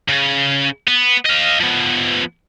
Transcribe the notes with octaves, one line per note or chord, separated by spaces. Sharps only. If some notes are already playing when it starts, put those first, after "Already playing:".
C#3
B3
D#5 F5
F3 B3